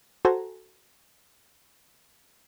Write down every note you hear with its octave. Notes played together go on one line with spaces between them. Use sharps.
F#4 A4 C5 G#5 A#5